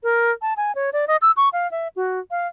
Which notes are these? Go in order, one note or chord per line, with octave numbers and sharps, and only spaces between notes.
A#4
A5
G#5
C#5
D5
D#5
E6
C#6
F5
E5
F#4
F5